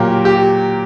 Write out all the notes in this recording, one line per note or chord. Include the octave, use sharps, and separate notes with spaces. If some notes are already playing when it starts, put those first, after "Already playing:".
Already playing: A#2 F#3 A#3 G4
G4